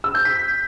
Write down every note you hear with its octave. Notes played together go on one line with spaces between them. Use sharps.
E6
G6
B6